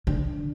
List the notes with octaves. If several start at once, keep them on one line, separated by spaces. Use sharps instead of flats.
D3